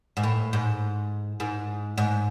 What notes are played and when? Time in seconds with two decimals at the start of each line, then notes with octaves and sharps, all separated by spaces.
0.17 G#2
0.23 A2
0.53 G#2
1.40 G#2
1.98 G#2